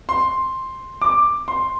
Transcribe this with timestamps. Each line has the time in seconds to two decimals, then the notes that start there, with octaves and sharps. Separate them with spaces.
0.09 C6
1.02 D6
1.48 C6